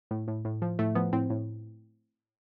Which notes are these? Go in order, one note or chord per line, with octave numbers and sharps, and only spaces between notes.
A2
A2
A2
F3
A2 A3
F3 B3
A2 C4
A2